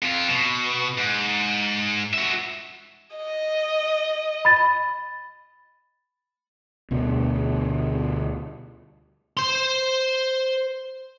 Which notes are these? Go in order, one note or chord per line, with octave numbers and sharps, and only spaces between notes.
F2 F4
B2
G#2
F#4 E5
D#5
B5 A6
D2 B2 D3
C5 C6